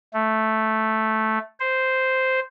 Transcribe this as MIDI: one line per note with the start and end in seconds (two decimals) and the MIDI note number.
0.14 1.38 57
1.60 2.40 72